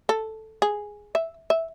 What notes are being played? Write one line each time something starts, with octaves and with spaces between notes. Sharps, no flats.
A4
G#4
E5
E5